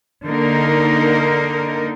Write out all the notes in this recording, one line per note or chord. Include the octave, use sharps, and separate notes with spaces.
D3 A#3 D#4 A#4